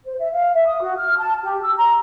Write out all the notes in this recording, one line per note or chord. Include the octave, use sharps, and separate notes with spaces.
C5
E5
F5
E5
D#6
F#4
F6
A5
G4
E6
A#5